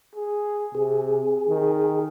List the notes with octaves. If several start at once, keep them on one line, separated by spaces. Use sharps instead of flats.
G#4
C3 G#4
D#3